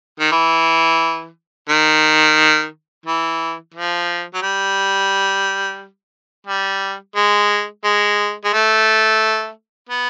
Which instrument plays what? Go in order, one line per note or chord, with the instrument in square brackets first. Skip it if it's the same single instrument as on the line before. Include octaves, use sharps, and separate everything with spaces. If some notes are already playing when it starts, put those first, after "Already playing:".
[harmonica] D#3
E3
D#3
E3
F3
F#3
G3
G3
G#3
G#3
G#3
A3
B3